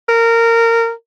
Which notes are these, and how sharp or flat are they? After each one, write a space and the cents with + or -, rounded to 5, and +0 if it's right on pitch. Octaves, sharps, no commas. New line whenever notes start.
A#4 -20